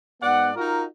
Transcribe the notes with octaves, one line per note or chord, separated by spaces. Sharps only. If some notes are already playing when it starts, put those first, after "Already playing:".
G#2 B3 D5 F#5
D#4 F4 F#4 A#4